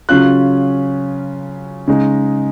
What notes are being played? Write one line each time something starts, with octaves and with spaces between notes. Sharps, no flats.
C#3 F#3 C#4 F4 F#6
C#3 G#3 D#4